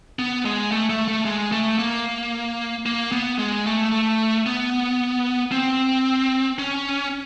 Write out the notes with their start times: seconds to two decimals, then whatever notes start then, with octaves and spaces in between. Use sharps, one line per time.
0.19 B3
0.45 G#3
0.72 A3
0.90 A3
1.08 A3
1.25 G#3
1.52 A3
1.79 A#3
2.86 A#3
3.12 B3
3.39 G#3
3.66 A3
3.92 A3
4.46 B3
5.52 C4
6.58 C#4